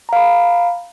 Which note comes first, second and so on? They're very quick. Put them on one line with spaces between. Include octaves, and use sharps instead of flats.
A#5 F5 B5